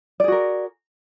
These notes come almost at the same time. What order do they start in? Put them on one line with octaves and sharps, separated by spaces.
D5 G#4 F#4 A#4